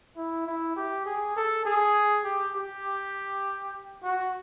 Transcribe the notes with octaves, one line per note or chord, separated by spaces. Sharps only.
E4
E4
G4
G#4
A4
G#4
G4
G4
F#4